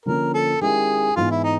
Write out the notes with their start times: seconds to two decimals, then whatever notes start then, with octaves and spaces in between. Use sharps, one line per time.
0.06 D3 F3 A#3 C#4 A#4
0.34 A4
0.61 D#3 G#3 C#4 E4 G4 G#4
1.16 G#2 E3 G#3 B3 F4
1.31 E4
1.44 D#4